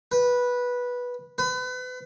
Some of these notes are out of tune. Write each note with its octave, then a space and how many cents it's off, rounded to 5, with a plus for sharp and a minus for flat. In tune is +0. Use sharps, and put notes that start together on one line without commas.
B4 -10
B4 +35